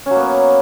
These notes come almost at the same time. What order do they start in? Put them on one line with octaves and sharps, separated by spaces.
C#4 F#3 A#3 B3